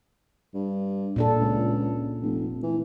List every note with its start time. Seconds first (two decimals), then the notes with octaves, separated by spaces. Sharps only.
0.54 G2
1.16 A#2 D4 A4
1.41 C#2
2.22 F1
2.63 E3